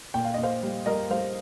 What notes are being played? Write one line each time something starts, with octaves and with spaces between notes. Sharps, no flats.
A#2 G5
F5
A#2 D#5
C5 F5
G3
G3 A#4 D#5
G3 C5 F5